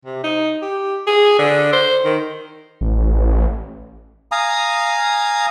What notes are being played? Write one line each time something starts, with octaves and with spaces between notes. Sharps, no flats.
C3
D#4
G4
G#4
D3
C5
D#3
A1
F5 G#5 A#5 D#6